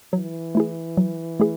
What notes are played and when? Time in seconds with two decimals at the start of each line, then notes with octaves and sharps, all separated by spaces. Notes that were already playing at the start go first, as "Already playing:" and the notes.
0.13 E3 F#3
0.55 A3 E4 G#4
0.97 F#3
1.40 A3 E4 G#4